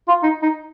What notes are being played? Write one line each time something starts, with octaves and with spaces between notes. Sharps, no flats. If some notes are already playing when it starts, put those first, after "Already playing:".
F4
D#4
D#4